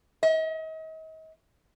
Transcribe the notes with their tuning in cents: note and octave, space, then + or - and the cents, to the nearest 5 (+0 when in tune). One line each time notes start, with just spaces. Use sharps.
D#5 +40